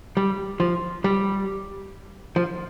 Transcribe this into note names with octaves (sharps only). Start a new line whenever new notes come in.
G3
F3
G3
F3